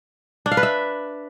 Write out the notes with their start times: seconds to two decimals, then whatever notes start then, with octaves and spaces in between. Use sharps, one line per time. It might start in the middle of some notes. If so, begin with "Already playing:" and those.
0.46 D4
0.52 F5
0.57 B4
0.63 E5